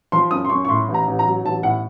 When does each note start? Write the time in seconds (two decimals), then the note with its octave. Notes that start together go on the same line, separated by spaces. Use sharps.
0.12 F3 C6
0.31 F#2 D#6
0.45 C6
0.50 F#2 C#6
0.65 C#6
0.69 A2 C6
0.88 A1
0.94 A#5
1.07 A1
1.19 A#5
1.27 F#3
1.44 A1 A5
1.63 A2 F#5